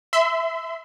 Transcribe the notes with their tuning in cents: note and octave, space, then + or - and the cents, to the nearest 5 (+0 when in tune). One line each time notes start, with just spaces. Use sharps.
E5 +0 C6 -40